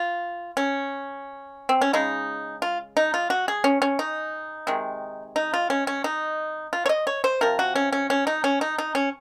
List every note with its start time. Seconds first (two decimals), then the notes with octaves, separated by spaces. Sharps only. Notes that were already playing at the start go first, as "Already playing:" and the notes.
Already playing: F4
0.57 C#4
1.69 C4
1.81 C#4
1.93 C#3 G#3 D#4
2.62 F4
2.97 D#4
3.14 F4
3.30 F#4
3.48 G#4
3.64 C#4
3.82 C#4
3.99 D#4
4.67 C3 D#3 G#3
5.36 D#4
5.54 F4
5.70 C#4
5.87 C#4
6.04 D#4
6.73 F4
6.86 C#5
6.89 D#5
7.07 C#5
7.24 C5
7.41 C3 F3 A#4
7.59 F#4
7.76 C#4
7.92 C#4
8.10 C#4
8.27 D#4
8.44 C#4
8.61 D#4
8.78 D#4
8.95 C#4